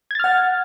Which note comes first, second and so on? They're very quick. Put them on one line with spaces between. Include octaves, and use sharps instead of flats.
G#6 A6 F6 F#5